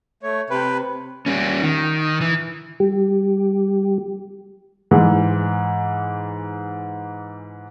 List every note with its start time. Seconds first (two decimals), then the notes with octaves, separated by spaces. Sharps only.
0.23 A3 C#5
0.50 C3 B4 G5
1.26 G3 C#4
1.62 D#3
2.21 E3
2.80 G3 G4
4.91 G#2 E3